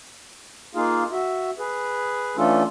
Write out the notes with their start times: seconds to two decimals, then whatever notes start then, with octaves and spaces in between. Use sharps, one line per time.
0.75 A#3 D#4 F4 G#4 F5
1.12 F#4 E5
1.58 G#4 B4
2.37 E3 A3 C#4 D4 F4 A4